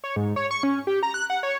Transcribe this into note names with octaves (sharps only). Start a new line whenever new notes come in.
C#5
G#2
C#5
C#6
C#4
G4
A#5
F#6
F#5
C#5